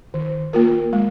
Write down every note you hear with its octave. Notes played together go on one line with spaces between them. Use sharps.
D#3
A#3 F4 A#4
G#3